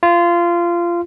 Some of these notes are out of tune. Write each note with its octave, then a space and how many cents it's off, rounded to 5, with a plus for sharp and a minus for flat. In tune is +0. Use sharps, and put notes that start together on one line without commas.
F4 -20